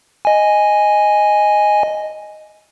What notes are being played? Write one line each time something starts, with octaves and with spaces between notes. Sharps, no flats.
D#5 G#5